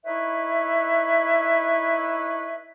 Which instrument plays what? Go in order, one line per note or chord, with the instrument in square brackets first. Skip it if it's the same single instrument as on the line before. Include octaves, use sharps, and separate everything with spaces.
[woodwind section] D#4 E4 B4 C#5 E5